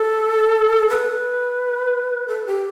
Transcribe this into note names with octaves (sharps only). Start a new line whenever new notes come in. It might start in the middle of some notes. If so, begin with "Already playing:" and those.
Already playing: A4
B4
A4
G4